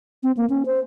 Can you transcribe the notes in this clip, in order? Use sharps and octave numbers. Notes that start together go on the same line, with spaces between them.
C4
A#3
C#4
C5